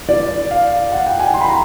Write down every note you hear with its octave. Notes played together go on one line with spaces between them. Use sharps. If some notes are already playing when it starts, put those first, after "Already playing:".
D5
F5
F#5
G5
G#5
C6
B5
A#5